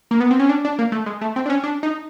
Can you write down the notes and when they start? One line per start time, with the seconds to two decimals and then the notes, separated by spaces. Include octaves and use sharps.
0.11 A#3
0.20 B3
0.31 C4
0.40 C#4
0.49 D4
0.65 D4
0.79 A#3
0.92 A3
1.06 G#3
1.21 A3
1.36 C4
1.46 D4
1.50 C#4
1.64 D4
1.83 D#4